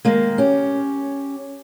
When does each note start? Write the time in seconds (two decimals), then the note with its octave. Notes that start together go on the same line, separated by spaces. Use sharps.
0.05 D#3 G#3 A#3
0.38 C#4 G4